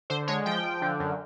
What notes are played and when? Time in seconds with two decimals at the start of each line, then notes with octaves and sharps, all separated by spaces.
0.10 D3 C5
0.28 G#3 C#5
0.46 F3 G5
0.64 F3
0.82 D3
1.00 F#2